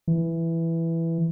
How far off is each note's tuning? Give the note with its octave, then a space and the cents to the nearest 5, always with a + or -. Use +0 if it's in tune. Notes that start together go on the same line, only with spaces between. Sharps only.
E3 +5